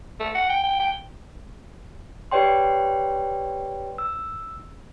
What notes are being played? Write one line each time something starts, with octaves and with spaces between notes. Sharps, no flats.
A3
F#5
G5
G5
G5
G4 B4 C#5 D5 G5 C6
E6